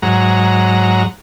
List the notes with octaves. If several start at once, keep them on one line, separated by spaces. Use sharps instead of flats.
G#2 F#3 A#5